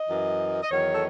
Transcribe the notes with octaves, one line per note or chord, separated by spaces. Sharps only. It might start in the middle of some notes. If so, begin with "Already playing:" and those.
Already playing: D#5
F#2 E3
D#5
E2 D#3 F#3 C#5
A4